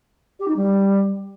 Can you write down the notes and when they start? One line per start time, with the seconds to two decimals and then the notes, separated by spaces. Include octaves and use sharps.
0.39 G4
0.48 D#4
0.56 G3